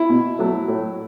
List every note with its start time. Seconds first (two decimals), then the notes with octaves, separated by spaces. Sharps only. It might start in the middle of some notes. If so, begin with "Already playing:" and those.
Already playing: E4
0.09 B2
0.39 F#3 A3
0.68 A2